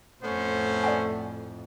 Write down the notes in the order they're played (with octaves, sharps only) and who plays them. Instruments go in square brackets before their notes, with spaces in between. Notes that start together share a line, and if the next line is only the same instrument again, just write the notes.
[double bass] F2 A2 [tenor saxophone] A3 [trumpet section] B3 C#4 C5
[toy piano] D5 F#5 G#5